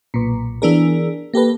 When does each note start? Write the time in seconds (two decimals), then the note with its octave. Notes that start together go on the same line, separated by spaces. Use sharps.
0.14 B1 A#2
0.62 E3 B3 D4 G#4 A#4
1.34 A#3 G4 A4 B4